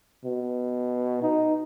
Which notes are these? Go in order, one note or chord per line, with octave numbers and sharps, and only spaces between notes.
B2
D#4